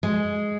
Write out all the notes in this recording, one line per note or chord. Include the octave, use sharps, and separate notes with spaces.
G#3